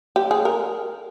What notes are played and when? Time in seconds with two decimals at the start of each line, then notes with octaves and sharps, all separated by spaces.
0.16 G4
0.31 G#4
0.45 A#4